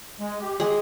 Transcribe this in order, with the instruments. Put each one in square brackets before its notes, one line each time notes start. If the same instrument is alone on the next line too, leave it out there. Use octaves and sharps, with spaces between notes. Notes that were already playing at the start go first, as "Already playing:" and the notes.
[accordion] G#3
G4
[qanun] G#3